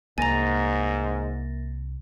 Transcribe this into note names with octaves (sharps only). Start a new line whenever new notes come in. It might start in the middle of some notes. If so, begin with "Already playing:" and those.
C2 G#2 A#3 G#5 A#5 A6 A#6